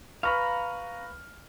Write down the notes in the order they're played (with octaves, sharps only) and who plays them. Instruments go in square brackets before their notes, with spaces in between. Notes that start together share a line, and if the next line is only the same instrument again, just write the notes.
[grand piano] B4 C#6 F6 [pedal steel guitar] F5 A#5 B5